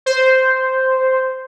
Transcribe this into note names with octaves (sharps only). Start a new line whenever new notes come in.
C5